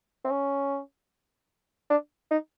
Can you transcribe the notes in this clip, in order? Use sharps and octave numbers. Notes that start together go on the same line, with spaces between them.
C4
C#4
D4
D#4